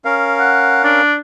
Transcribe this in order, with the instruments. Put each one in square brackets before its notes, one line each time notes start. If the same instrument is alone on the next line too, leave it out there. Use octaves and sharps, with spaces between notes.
[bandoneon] C#4 A#4 F5
[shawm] F#5
D4